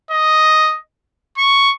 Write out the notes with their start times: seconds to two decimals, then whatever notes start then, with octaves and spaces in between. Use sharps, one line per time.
0.11 D#5
1.38 C#6